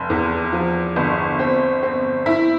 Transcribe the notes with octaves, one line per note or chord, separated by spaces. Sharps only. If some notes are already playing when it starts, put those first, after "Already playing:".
Already playing: F1
E2
F3
G1
C4
C4
E4